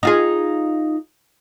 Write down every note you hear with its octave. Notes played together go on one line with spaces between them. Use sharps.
D#4 F4 G#4